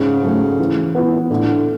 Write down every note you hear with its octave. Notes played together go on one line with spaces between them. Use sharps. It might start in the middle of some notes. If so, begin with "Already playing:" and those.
Already playing: G#2 C#3
F#3 A3
E3
B3 E4
A2 D3